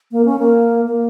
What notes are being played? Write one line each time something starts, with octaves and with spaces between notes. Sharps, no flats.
A#3
C#4
A#3
A#3